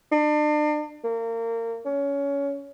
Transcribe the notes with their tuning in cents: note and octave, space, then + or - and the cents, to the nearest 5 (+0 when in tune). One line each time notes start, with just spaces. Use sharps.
D4 +40
A#3 -30
C#4 +20